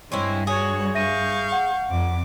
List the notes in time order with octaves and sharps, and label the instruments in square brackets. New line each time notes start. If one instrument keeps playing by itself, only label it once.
[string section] G2 [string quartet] G#3 [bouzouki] C4 C#4 E4
[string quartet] F#4 C#5 [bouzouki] G#4
[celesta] E5 A#6 D#7 [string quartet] F5 C#6 G6
[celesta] F#5
[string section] F2 [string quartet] D6